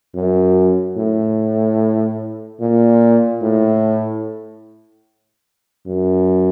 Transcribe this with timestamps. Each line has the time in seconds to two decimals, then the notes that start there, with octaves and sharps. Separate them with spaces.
0.15 F#2
0.96 A2
2.60 A#2
3.42 A2
5.87 F#2